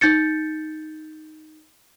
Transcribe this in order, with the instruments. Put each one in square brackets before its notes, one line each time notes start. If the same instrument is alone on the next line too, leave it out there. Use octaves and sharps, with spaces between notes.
[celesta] D#4 G6 A6 C#7